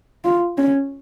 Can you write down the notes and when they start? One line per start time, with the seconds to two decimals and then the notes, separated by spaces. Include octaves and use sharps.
0.24 F4
0.58 C#4